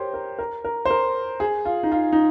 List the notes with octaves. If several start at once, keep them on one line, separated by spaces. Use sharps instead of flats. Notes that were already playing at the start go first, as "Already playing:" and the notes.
Already playing: G4 A#4 C5 C#5
A#4
A#4
A#4
C5
A#4
G#4
F4
D#4
F4
D#4